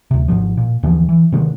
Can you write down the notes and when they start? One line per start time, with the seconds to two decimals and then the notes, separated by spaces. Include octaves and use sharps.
0.11 D2 C3
0.28 G#1 C#2 G#2 F3
0.57 A#2
0.83 D#2 D3 E3 F3
1.09 E3
1.32 C3 D#3 F#3 G#3